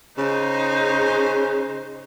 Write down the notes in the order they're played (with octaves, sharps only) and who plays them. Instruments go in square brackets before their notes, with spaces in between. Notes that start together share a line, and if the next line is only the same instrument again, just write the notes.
[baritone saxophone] C#3 [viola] D#4 C5